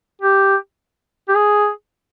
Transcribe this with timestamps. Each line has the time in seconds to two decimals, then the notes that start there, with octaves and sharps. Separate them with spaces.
0.22 G4
1.28 G4
1.35 G#4